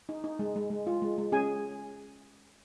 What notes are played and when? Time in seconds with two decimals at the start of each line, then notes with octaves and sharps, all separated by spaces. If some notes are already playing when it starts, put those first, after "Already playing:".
0.09 D#4
0.24 D#4
0.39 G#3
0.56 G#3
0.70 G#3
0.87 F4
1.02 G#3
1.18 G#3
1.32 C#4 G#4 G#5